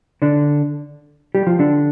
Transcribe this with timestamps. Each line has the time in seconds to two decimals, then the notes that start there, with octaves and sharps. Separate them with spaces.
0.22 D3 D4
1.35 G3 G4
1.47 F3 F4
1.59 D3 D4